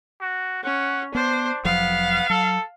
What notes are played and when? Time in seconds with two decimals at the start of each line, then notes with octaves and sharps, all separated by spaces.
0.21 F#4
0.64 C#4 F#5
1.15 B3 D4 C5
1.65 F1 F3 F#3 B3 F5
2.30 F#3 A4